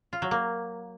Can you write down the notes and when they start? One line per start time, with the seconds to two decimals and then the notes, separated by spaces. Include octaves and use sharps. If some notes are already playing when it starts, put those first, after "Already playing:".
0.13 F4
0.22 F#3
0.31 A#3